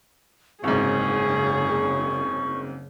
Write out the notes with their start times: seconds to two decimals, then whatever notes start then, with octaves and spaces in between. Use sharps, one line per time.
0.64 F#1 C2 G#2 C#3 G#4 C#6